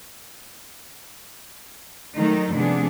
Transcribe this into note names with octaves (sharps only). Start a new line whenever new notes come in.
D#3 F#3 A3 D#4
C3 F3 A3 B3 D4 G#4